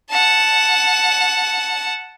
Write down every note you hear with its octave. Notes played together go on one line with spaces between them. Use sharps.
F#5 A5